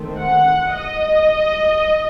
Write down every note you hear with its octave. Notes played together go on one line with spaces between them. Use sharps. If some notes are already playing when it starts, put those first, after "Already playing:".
Already playing: D#3 A3 C4
F#5
D#5